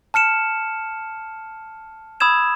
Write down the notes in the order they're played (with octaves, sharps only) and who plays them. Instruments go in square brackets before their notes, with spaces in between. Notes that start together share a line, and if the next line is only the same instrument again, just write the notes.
[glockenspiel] A5 F6 C#7 E7
B5 D#6 E6 G#6 E7